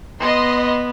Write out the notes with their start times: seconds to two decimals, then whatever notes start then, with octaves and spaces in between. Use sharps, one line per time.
0.20 B3 D#5 C6